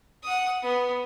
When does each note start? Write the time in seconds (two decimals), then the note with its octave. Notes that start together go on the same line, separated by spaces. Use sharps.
0.24 F#5 D#6
0.63 B3